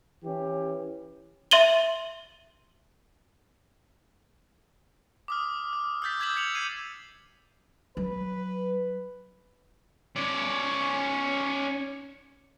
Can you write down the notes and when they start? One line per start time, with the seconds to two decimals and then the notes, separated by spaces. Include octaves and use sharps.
0.23 E3 C#4 G4
1.51 E5 C6 A6 D#7 F#7 G7
5.28 D6 D#6 F6
5.73 F6
6.02 E6 F6 G6 A6 B6
6.20 D#6 G#6 B6 E7 F#7
6.35 G#6 B6 C#7 F7 F#7
6.55 G#6 C7 D#7
7.97 F#3 B4
10.16 C#4 D5